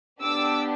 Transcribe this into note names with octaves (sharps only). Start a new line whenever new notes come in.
B3 D4 G4 D6 E6